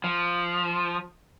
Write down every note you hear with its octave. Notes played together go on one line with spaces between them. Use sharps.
F3